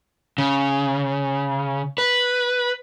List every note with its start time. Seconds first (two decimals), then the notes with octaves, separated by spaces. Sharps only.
0.38 C#3
1.98 B4